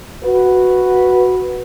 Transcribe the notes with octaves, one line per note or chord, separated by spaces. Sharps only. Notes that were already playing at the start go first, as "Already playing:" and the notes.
F#4 B4